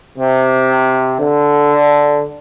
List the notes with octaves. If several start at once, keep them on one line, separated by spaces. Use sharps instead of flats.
C3
D3